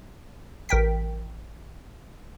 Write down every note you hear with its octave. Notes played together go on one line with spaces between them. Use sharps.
A1 A#4 G5 B6